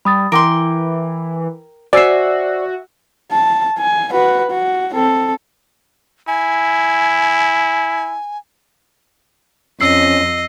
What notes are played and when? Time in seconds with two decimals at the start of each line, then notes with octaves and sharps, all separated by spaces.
0.05 G3 B5 D#6 A6
0.32 E3 A#4 G5 C6 D6 D7
1.93 F#4 C5 D5 E5 G#5 E6 C7
3.32 A5
3.79 G#5
4.12 F#4 B4
4.50 F#4
4.94 C4 A4
6.27 E4 G#5
9.81 F2 C#4 D#5 E6 C7